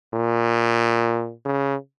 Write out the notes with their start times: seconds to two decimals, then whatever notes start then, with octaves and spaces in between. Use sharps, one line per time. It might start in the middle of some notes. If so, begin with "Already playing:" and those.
0.13 A#2
1.45 C#3